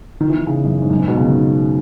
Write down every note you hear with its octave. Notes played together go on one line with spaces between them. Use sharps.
D#3
E3
D#3
C#3
F#2
G#2
F#2
G#2
B2
C#3
D#3